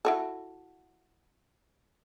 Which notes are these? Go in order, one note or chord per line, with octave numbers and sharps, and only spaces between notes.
E4 F#4 A4